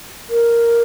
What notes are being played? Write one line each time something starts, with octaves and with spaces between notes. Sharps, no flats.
A#4